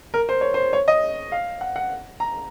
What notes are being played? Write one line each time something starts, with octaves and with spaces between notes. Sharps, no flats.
A#4
C5
C#5
C5
C#5
D#5
F5
F#5
F#5
A#5